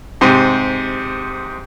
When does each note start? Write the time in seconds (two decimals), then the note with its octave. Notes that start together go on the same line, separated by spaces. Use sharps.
0.21 G#2 C3